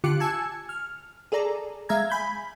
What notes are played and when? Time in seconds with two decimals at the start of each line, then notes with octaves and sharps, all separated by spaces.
0.04 D3 F4 G4 D6 F#6 C#7
0.20 G#5 A5 E6 G#6 C#7
0.69 F6
1.32 G#4 A4 D5 A#5
1.89 G#3 E5 F5 A#5 G#6
2.10 G#5 B5 G6